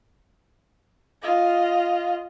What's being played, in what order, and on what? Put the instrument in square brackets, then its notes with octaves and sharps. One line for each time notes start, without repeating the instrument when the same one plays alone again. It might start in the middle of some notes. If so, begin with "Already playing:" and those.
[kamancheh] F4 D#5